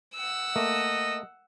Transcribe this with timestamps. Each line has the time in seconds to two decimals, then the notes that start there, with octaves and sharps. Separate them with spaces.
0.16 F#5 E6
0.56 A3 A#3 D#5